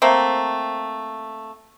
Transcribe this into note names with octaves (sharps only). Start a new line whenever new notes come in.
A3 A#3 C4